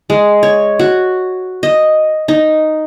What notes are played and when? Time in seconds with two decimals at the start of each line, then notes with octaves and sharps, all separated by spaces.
0.10 G#3
0.43 C#5
0.79 F#4
1.63 D#5
2.28 D#4